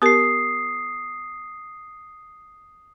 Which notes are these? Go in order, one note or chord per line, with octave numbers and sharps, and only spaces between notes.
B3 G4 A#4 D#6 C7